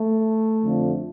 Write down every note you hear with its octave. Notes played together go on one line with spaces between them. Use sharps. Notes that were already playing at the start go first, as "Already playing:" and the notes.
Already playing: A3
F2 D3 F3